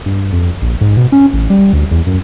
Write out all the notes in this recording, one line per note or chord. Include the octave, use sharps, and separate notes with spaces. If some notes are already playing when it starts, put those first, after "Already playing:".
G2
F2
A#1
G#2
B2
C#4
A1
G3
D2
E2
F#2